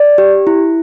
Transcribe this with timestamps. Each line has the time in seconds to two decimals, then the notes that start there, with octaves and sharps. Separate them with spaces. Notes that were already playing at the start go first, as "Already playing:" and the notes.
Already playing: D5
0.18 G4
0.47 E4